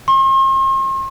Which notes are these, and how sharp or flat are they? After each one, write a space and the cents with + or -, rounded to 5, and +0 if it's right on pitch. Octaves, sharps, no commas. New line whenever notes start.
C6 +45